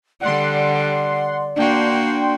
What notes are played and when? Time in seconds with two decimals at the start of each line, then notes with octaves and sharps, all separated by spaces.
0.21 D3 G3 D5 F#5 C6
1.56 A#3 D4 F#4 G5 C6